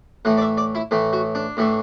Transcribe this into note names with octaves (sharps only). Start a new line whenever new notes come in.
A2 E3 A3 F#5
D5
E5
D5
E4
A2 E3 A3
F#4
D4
A2 E3 A3